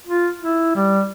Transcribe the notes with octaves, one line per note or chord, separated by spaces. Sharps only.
F4
E4
G3